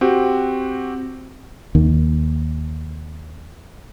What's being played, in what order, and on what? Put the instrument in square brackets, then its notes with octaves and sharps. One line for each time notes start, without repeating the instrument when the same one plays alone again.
[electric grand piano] C4 F#4 G4
[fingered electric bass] D#2 D#3